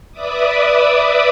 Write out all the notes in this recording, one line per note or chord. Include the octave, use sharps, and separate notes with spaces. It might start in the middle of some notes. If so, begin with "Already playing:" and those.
B4 D5 E5 D6 D#6